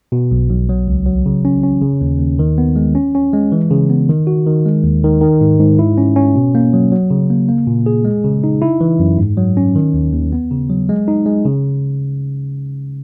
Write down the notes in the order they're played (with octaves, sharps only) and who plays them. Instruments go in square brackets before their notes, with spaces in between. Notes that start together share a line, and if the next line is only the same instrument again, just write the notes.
[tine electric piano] B2
B1
B1
F#3
C#2
F#3
C#3
C#4
C#4
C#3
D#2
D#2
D#3
B3
G#3
C#4
C#4
G#3
E3
C#3
B3
D#3
F#4
D#3
G#3
D#2
D#3
D#3
G#2
G#2
E4
C#4
C#4
B2
A#3
F#3
F#3
C#3
A#3
A#3
A#2
G#4
G#3
C#3
D#4
E4
E3
F#2
G#2
F#3
C#4
D#3
D#2
D#2
B3
C#3
F#3
G#3
D#4
G#3
C#3